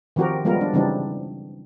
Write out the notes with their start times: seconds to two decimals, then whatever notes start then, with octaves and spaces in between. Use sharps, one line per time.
0.16 D#3 F3 C4 F#4 G4 A#4
0.45 F3 G3 G#3 B3 F4 A#4
0.61 D4
0.74 C#3 E3 G3 C4 D4 D#4